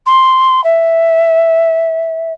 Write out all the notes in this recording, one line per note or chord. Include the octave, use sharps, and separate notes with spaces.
C6
E5